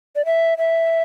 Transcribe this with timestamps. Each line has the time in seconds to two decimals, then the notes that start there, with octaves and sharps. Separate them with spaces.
0.16 D5
0.26 E5
0.58 E5